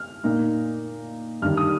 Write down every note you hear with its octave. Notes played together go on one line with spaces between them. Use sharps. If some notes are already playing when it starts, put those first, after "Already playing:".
Already playing: F6
A#2 A#3 D#4
G2 D#3 G3 F6
D#6